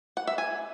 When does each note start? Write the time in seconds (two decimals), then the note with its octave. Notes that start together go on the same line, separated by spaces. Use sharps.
0.17 F#5
0.27 E5
0.38 G#5